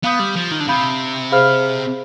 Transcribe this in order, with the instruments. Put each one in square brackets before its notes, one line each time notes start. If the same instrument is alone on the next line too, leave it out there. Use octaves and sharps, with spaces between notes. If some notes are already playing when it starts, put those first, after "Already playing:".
[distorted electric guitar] B3 [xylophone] F5 B5 D#6 G6
[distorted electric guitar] G3
F3
D#3
D3
[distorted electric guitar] C3 [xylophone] F5 B5 D#6 G6
[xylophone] G#4 C5 F5 B5 F6